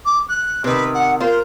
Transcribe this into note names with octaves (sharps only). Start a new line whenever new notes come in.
D6
F#6
C3 D#3 B4
F#5
F4 A#4 C5